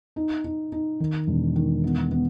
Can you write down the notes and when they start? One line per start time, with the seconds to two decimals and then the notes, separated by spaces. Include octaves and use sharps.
0.16 D#4
0.44 D#4
0.72 D#4
1.00 D#3
1.27 E1
1.56 D#3
1.84 B3
2.11 B3